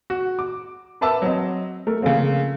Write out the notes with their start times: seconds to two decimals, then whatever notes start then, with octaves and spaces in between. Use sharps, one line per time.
0.10 F#4
0.39 D6
1.01 A#4 B4 E5 A5 D6 E6
1.22 F#3 C4 D#5
1.87 A3 A#4
2.02 C#3 F3 A3 A#3 C4